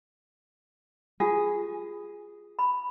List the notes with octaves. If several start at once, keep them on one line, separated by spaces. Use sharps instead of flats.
F4 G4 G#4
B5